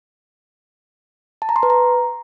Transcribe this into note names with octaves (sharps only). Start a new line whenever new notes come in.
A5
A#5
C6
B4
A#5